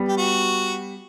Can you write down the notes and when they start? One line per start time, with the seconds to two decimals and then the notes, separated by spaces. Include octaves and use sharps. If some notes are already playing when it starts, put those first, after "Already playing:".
Already playing: G3 B3
0.09 G4
0.17 F#4